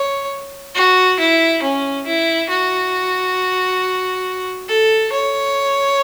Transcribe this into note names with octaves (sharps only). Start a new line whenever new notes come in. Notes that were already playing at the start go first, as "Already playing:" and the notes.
Already playing: C#5
F#4
E4
C#4
E4
F#4
A4
C#5